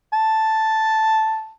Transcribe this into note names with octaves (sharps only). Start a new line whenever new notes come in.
A5